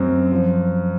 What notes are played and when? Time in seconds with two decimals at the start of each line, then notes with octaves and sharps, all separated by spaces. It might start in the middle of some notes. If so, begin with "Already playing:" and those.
Already playing: F#2 C4
0.32 F3